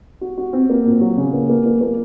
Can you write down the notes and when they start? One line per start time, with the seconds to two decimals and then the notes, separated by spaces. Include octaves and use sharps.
0.21 F#4
0.38 F#4
0.53 C4
0.69 A#3
0.86 A#2
1.01 F#3
1.17 C#3
1.33 A#3
1.50 A#3
1.66 A#3
1.81 A#3